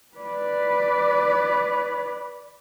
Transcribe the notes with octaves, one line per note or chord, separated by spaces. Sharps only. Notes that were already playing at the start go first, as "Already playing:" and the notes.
B4 D5